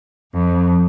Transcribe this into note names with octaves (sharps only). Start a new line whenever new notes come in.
F2